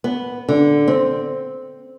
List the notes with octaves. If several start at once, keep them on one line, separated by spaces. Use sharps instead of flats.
B3
D3
C4